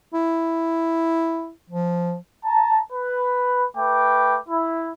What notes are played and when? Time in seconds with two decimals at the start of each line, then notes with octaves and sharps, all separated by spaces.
0.14 E4
1.70 F3
2.45 A5 A#5
2.92 B4
3.77 A3 B4 G5 D6
4.49 E4